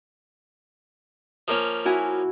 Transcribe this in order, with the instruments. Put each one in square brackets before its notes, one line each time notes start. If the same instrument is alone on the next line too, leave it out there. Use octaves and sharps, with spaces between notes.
[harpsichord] F3 A#3 C#4
[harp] E4 F#4 G#5